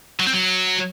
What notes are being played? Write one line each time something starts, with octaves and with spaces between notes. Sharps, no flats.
F#3
C4
F#3